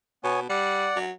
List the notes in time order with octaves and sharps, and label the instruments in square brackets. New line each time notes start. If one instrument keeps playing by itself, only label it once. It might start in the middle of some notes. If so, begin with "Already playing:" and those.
[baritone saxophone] B2 [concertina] B3 C#5 G#5
[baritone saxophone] G3 [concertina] D5 F#5
[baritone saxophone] F#3